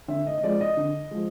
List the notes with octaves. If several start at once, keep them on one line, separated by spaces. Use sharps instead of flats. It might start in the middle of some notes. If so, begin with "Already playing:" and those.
D3 E5
D#5
D#5
F3 G#3 D5
D#5
D3
F3 G#3